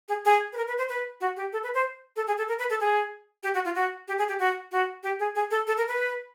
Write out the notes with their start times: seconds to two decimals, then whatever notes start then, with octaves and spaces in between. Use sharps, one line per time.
0.09 G#4
0.25 G#4
0.53 B4
0.57 A#4
0.68 B4
0.78 C5
0.89 B4
1.21 F#4
1.37 G4
1.53 A4
1.63 B4
1.74 C5
2.16 A4
2.27 G#4
2.38 A4
2.48 A#4
2.59 B4
2.70 A4
2.80 G#4
3.43 G4
3.54 F#4
3.65 F4
3.75 F#4
4.08 G4
4.18 G#4
4.28 G4
4.39 F#4
4.72 F#4
5.03 G4
5.19 G#4
5.35 G#4
5.51 A4
5.67 A4
5.77 A#4
5.88 B4